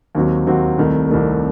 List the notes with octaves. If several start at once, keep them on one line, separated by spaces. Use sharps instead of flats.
D#2 D#3 F#3 C4 F#4
D#2 D#3 F#3 C4 F#4
C2 C3 D#3 A3
C2 C3 D#3 A3